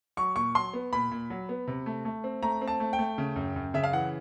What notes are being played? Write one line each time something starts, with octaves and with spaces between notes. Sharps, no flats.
F#3 C#6
A#2 C#6
F#3 C6
B3
A#2 B5
A#2
F#3
B3
C3
A3
A3
C4
A3 A#5
C4
A5
A3
G5
A3
C#3
F#2
F#2
C#3 E5
F5
E3 F#5